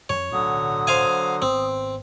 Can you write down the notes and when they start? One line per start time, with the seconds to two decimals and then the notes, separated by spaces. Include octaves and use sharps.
0.09 F2 C#5
0.32 D1 B1 D3 F#3 D4 D#6
0.87 C5 F5 G#5
1.42 G#1 B3 C4